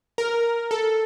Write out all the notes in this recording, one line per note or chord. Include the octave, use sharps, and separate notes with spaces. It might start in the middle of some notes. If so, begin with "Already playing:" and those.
A#4
A4